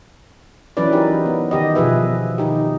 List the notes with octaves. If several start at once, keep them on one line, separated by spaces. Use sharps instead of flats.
E3 F#3 C#4 E4 B4 D5
D#4 G4 A#4
B3
D#3 G4 D#5
B2 F3 G#4 B4 E5
D#3 D#4 G4